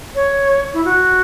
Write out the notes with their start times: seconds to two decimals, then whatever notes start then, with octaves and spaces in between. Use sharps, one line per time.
0.15 C#5
0.73 E4
0.85 F#4